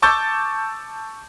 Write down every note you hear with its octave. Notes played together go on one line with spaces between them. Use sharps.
A5 C#6 D6 E6 G6 A6